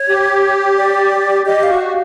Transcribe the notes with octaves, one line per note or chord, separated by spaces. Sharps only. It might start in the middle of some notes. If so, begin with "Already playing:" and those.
Already playing: C#5
G4
D5
G4 D#5
F5
F#4